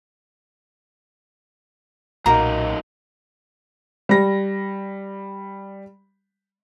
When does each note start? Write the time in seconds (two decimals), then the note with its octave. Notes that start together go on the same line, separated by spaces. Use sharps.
2.26 B1 F#2 A#2 A#3 D#4 F#4 A#5
4.09 G3 A#6